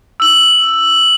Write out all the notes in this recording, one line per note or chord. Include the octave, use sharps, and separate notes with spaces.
E6 F#7